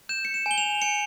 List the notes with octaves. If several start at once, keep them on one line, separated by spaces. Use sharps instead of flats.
G6 E7
C#7
E7
G#5 G7
F7
G#5 C#7